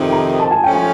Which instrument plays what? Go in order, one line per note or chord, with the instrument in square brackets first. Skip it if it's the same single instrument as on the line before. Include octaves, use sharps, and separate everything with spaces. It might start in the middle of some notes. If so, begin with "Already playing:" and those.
Already playing: [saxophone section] F2 C3 D#3
[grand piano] A#5
A5
G#5
[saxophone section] F3 A3 C#4 [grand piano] G5
[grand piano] G#5